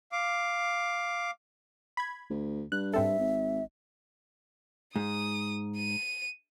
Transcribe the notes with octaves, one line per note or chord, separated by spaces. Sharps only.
F5 D6
B5 G#6
D2
G2 F#6
G#2 C4 A4 E5
G#1
G#2 D#6
D#7